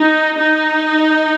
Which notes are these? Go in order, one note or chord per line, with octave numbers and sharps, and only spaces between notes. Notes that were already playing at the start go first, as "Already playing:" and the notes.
Already playing: D#4
D#4